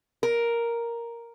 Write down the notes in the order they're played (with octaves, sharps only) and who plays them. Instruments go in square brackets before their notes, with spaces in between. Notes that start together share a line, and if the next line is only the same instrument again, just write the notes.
[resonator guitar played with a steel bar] A#4